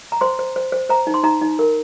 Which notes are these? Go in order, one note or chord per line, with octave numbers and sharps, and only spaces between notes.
A#5
C5 C6
C5
C5
C5
C5 A#5
D#4
C6
D#4 A#5
D#4
A#4